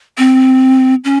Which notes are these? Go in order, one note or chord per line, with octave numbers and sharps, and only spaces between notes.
C4
C#4